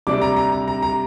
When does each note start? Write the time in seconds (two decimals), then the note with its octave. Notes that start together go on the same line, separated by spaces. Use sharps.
0.07 C3 G3 D4 D6
0.21 A#5
0.36 A#5
0.52 A#5
0.68 A#5
0.82 A#5